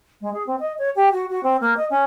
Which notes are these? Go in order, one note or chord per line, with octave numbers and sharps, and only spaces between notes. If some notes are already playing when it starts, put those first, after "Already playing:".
G#3
G#4
C4
D#5
C#5
G4
F#4
F#4
C4
A#3
D#5
C#4